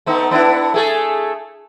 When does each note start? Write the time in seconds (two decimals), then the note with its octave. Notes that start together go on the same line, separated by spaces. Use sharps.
0.06 A3 B3 D#4
0.31 B3 D4 E4
0.74 A3 G#4 A4